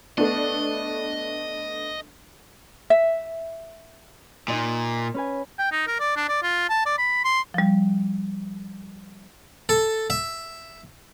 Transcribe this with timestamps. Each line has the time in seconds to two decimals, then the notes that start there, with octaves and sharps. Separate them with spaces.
0.18 A3 B3 D4 D#5
2.90 E5
4.48 A#2 D#4 D#5 C6
5.14 C#4 B4 G#5
5.59 G5
5.72 D#4
5.87 A#4
6.00 D5
6.16 D4
6.29 D5
6.42 F4
6.70 A5
6.86 D5
6.98 B5
7.25 C6
7.54 F3 G3
9.69 A4
10.10 E5